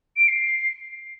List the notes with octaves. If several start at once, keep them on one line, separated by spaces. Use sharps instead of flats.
D7
C7